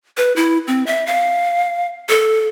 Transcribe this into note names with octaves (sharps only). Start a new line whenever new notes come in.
B4
E4
C4
E5
F5
A4